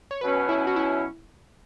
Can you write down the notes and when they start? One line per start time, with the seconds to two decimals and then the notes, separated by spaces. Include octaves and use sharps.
0.11 C#5
0.21 B2 F#3 C#4 B4
0.49 E4
0.67 F#4
0.76 E4